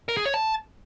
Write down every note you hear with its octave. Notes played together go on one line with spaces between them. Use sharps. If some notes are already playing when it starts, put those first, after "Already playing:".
A#4
G#4
C#5
A5